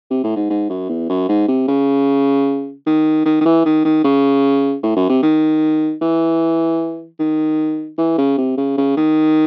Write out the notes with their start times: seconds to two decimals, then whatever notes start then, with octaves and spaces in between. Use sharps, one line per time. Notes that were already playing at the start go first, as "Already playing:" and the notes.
0.10 C3
0.24 A2
0.36 G#2
0.50 G#2
0.70 F#2
0.89 E2
1.09 F#2
1.29 G#2
1.48 C3
1.68 C#3
2.86 D#3
3.25 D#3
3.41 D#3
3.45 E3
3.65 D#3
3.85 D#3
4.04 C#3
4.83 A2
4.97 F#2
5.10 C3
5.23 D#3
6.01 E3
7.20 D#3
7.98 E3
8.18 C#3
8.38 C3
8.57 C#3
8.77 C#3
8.97 D#3